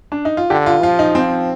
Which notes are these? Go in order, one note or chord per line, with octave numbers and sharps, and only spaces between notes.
D4
D#4
F4
D3 G4
F4
F3 F4
D#4
C4